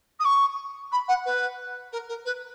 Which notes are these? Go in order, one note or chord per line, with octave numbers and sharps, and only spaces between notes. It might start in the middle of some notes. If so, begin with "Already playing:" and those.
D#6
C#6
B5
F#5
B4
A#4
A#4
B4